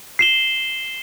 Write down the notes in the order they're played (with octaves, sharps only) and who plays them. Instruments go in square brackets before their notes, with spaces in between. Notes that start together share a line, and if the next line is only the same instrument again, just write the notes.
[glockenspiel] C7 E7 G7